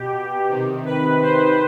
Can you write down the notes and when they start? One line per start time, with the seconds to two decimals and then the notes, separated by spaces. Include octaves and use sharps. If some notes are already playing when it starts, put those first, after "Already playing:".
Already playing: B2 G4
0.49 C3 D#3
0.86 B4
1.22 C5